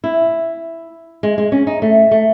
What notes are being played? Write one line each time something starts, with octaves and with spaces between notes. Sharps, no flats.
E4
G#3
G#3
C#4
D#4
A3
A3